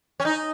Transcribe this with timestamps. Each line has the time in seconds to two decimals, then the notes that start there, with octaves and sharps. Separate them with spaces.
0.20 C#4
0.25 D#4